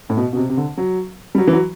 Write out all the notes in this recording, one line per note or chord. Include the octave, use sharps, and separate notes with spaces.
A2
B2
B2
C3
C3
D3
F#3
G3
F#3
E3
F#3